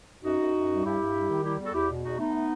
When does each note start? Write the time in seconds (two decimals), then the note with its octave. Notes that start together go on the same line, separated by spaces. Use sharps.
0.24 F#2 D#4 F#4
0.39 F#2
0.55 F#2
0.70 G3
0.84 G2 E4 G4
1.00 G2
1.14 G3
1.29 D#3
1.43 G3 E4 G4
1.59 E2
1.65 F#4 A4
1.73 E2 E4 G4
1.89 B2
2.03 E2 D#4 F#4
2.18 A3 B3 D#4
2.33 A3